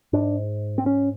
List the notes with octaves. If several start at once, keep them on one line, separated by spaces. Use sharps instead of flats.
G#2 D4
C4
C#4